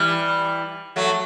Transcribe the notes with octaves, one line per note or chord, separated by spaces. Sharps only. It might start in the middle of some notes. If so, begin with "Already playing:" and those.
Already playing: E3 G3
F#3 A3